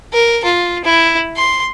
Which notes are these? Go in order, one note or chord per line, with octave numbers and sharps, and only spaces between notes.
A#4
F4
E4
C6